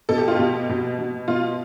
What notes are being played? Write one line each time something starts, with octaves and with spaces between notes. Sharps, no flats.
B2 A4
G4
F4
B2 G4
B2
B2
B2 F4